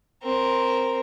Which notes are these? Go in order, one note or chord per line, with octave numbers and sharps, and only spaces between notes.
C4 A#4